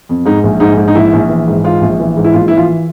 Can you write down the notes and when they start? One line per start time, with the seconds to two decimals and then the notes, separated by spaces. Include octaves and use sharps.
0.09 F2
0.26 G#2 D#4
0.44 A#1
0.60 G#2 D#4
0.78 G#2
0.88 D#4
0.95 A#1 E4
1.13 A#1
1.29 E3
1.48 G#2
1.64 G#2 F4
1.81 A#1
2.00 E3
2.17 G#2
2.25 E4
2.34 A#1 F4
2.48 E3 E4
2.57 F4